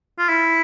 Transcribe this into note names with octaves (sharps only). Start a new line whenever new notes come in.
F4
E4